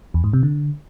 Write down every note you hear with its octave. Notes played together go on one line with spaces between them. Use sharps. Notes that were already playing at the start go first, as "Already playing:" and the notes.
E2
G#2
C3
D3